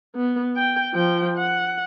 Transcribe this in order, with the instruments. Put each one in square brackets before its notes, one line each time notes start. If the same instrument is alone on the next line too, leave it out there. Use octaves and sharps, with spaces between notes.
[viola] B3
G5
F3 G5
F#5